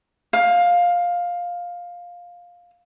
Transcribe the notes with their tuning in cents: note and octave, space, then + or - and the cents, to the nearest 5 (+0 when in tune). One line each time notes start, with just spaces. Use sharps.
F5 +10